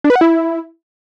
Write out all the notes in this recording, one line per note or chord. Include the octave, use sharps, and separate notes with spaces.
D4
B4
F#5
E4